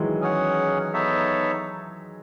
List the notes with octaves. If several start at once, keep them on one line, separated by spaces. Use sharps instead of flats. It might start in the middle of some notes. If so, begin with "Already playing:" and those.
Already playing: D#3 E3 F#3 G#3
C#4 G#4 C#5 F#5
B3 D#4 A4 C#5 E5